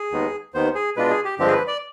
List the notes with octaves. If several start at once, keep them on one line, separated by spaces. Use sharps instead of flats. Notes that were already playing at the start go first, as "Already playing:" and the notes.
Already playing: G#4
D#2 D#3 G#3 B3
D#2 D#3 B3 C5
G#4
B2 G#3 D4 F4 B4
G#4
G4
G2 D3 F3 G#3 C4 G4
G#4
B4
D5